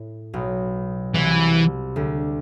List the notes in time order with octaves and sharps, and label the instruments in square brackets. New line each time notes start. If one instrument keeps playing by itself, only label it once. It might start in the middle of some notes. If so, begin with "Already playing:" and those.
Already playing: [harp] A2
B1 B2
[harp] C2 C3 [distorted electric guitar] E3
[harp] D2 D3